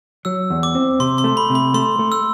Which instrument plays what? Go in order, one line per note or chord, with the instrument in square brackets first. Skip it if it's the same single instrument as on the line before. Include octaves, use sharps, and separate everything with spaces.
[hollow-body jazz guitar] F#3 [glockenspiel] E6
[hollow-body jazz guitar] E2
[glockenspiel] D6
[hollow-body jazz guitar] C4
[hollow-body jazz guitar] C3 [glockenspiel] C6
[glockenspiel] C6
[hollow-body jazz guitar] A3
[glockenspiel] B5
[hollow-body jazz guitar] C3
[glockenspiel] B5
[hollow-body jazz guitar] A3 [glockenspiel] C6
[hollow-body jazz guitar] A3
[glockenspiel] E6